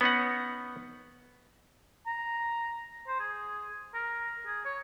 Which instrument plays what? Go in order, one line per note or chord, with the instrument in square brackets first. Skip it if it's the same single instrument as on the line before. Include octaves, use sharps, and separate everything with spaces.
[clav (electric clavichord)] B3 C#4 D#4 F#5
[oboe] A#5
C5
G#4
A#4
G#4
C#5